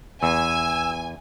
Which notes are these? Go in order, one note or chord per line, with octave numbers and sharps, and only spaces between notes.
E2 G#5 E6